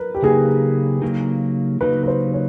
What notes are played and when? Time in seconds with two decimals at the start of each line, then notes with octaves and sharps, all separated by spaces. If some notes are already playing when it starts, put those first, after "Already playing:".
Already playing: A#4 B4
0.15 G4
0.22 C#3 F#3 A#3 D#4 G#4
1.02 C#3 F#3 A#3 D#4
1.81 C#3 F#3 A#3 D#4 B4
2.03 B4
2.08 C5
2.33 C#5